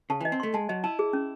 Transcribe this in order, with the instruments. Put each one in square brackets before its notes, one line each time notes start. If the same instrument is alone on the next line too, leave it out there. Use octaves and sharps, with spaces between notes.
[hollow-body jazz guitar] C#3 [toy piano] A5
[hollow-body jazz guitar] E3 [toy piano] D#5
[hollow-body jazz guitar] C4
[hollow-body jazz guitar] A3 [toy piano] C6
[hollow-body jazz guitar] G#3 [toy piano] A5
[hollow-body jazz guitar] F#3 [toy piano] D#5
[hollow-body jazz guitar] E4 [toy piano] A5
[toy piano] G#4
C#4